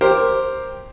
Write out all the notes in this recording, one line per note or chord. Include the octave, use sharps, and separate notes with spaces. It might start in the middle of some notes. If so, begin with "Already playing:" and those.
G4 A#4 C5